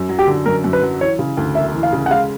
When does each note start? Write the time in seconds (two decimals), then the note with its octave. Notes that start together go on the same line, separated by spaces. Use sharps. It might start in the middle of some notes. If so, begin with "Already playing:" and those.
Already playing: F#2
0.09 F#3
0.19 G4
0.27 D3
0.46 F#2 A#4
0.64 F#2
0.73 B4
0.83 F#3
1.00 E3 C#5
1.19 C#3
1.37 D2
1.55 E1 E5
1.74 E3
1.83 F5
1.92 C#3
2.06 F#5
2.11 G#3 F5